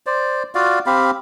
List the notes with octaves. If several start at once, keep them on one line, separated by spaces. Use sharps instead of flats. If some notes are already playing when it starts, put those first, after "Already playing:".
C5 D5
F4 F#4 D5 F5
C4 G4 F5 B5